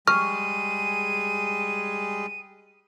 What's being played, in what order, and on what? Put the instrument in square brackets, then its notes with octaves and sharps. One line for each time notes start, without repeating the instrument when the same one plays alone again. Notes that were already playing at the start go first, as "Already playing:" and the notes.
[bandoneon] G3 G#3 G#4 [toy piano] C#6 [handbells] F6 [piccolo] D#7